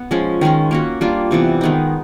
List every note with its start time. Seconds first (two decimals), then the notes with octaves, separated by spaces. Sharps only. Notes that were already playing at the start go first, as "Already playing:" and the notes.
Already playing: B3
0.11 F3 G#3 C#4
0.41 D#3 G#3 C#4 F4
0.71 A#3 C#4 F#4
1.01 G3 A#3 D4 F4
1.31 C3 E3 G3 B3
1.61 D#3 G#3 B3 D#4